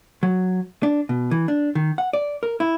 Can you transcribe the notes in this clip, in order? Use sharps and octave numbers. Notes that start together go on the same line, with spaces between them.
F#3
D4
B2
E3
D4
D#3
F#5
D5
A#4
E4